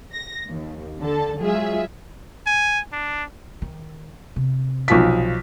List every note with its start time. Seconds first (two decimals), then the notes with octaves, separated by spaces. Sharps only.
0.13 A#6
0.47 D#2
1.01 D3 A4 A5
1.40 F#3 G#3 F4 G#4 E5
2.47 G#5
2.92 D4
3.62 D#3
4.36 C3
4.88 B1 F3 B6